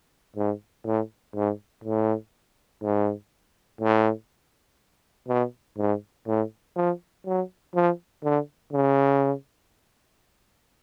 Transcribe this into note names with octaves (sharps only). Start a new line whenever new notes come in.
G#2
A2
G#2
A2
G#2
A2
B2
G#2
A2
F3
F#3
F3
D3
C#3